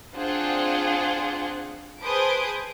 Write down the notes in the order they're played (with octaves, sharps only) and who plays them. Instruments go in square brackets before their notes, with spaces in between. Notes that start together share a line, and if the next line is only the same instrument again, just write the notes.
[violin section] C4 D4 F4 G#4 C5 F#5
G#4 B4 C5 A5 D#6 D7